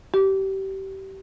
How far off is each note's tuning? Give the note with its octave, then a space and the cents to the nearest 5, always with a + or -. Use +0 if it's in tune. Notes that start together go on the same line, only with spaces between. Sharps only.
G4 -25